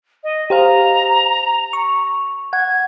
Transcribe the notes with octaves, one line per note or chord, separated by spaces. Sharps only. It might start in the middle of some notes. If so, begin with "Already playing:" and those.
D#5
G4 C5 F5 A#5
C#6
F#5 G#6